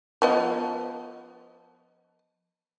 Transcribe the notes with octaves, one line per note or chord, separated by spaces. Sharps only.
F3 B3 D#5